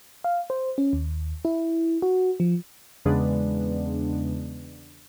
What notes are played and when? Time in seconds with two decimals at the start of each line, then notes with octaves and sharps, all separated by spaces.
0.24 F5
0.50 C5
0.78 C#4
0.93 D#2
1.45 E4
2.02 F#4
2.40 F3
3.05 E2 C#3 G#3 B3 D4